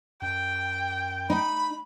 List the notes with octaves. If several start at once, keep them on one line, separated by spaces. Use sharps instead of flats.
F#2 G5
D#4 B5